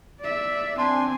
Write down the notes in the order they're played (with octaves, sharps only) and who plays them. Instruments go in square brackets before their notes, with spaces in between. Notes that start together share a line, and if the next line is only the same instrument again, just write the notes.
[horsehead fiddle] D5 E5
[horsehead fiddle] C4 G#5 [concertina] D4 C6